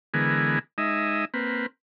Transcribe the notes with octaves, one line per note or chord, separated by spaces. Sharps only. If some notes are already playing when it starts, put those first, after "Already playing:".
D3 E3 G#3 B3 G#4 A#4
G#3 D#4 D#5 E5
A#3 C4 B4